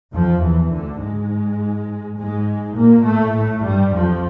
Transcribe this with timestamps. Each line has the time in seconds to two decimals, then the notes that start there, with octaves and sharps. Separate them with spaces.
0.13 F2 F3
0.42 E2 E3
0.71 D2 D3
1.01 G#2 G#3
2.18 G#2 G#3
2.76 A#2 A#3
3.05 A2 A3
3.35 A2 A3
3.64 G2 G3
3.94 F2 F3